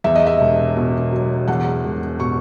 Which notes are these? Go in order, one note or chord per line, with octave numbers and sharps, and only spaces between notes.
E2 E5
D#5
E5
E1
B2
F#3
E2 F#5
E1
B2 C#6